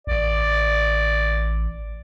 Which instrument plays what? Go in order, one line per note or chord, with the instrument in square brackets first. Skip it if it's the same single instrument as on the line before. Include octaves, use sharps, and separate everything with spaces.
[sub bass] A1 [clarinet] D5